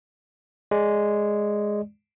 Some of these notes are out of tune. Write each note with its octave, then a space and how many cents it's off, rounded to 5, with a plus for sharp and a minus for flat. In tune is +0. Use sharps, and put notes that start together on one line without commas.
G#3 +0 D5 +0